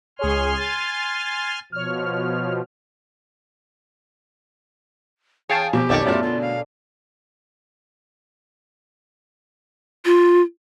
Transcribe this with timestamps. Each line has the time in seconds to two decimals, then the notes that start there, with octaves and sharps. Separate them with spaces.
0.19 C#2 G#4 C#5 G#5 C6 F6
0.57 A6 D#7
1.72 B2 F3 C#5 F6
5.49 E2 G#4 C#5 F5 G5 A5
5.73 B2 F3 G4
5.89 B1 F2 D#3 A4 C#5 D5
6.05 F#2 A2 A3 F4 A4 A#4
6.23 D3 F4
6.41 F5
10.05 F4